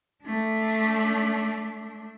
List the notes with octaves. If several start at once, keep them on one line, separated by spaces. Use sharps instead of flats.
A3 D4